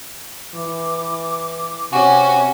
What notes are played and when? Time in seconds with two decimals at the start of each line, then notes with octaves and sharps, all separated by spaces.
0.55 E3 D6
1.92 C3 C#4 F#4 G#5